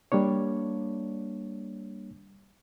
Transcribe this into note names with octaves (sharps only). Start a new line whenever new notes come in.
G3 A#3 D4 C#5